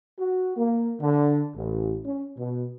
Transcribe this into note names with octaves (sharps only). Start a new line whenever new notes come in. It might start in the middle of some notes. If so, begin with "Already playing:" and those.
F#4
A#3
D3
A1
C#4
B2